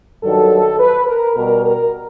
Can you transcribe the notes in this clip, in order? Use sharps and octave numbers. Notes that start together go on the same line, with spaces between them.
G2 D#3 F#3 A4
B4
A#4
B2 G3 A#4
A#4